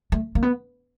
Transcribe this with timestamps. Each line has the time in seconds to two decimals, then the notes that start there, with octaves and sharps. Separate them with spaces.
0.12 A3
0.35 A#3
0.43 B3